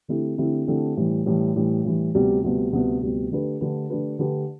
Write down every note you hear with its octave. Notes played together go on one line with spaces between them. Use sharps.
D3 A3 C4 E4 G4
D3 A3 C4 E4 G4
D3 A3 C4 E4 G4
A2 E3 G3
A2 E3 G3
A2 E3 G3
A2 E3 G3
D2 C3 G3 B3
D2 C3 G3 B3
D2 C3 G3 B3
D2 C3 G3 B3
D3 A3 D4 G4 B4
D3 A3 D4 G4 B4
D3 A3 D4 G4 B4
D3 A3 D4 G4 B4